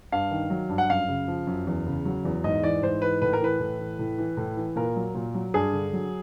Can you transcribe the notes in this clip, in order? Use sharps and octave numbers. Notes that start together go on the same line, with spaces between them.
G2 F5
D#3
F#3
G2
F#5
F#2 F5
C#3
F3
F#2
E2
C#3
F#3
E2
G#2 D#5
E3 D5
G#2 C5
E3 B4
A2 B4
A#4
E3 B4
A2
E3
A2
E3
A2
E3
A#2 A#4
F#3
A#2
F#3
G2 G#4
D3
F#3